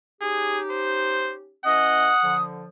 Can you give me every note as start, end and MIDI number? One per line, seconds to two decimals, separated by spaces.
0.21 1.53 61
0.21 1.53 63
0.21 1.53 67
0.21 0.61 68
0.71 1.34 72
1.65 2.11 52
1.65 2.11 61
1.65 2.11 75
1.65 2.36 78
1.65 2.43 87
2.23 2.67 50
2.23 2.67 53